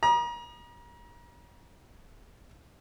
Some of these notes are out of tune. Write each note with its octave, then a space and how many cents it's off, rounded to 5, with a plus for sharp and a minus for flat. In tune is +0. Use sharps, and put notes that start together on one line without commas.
A#5 +35 D#6 -30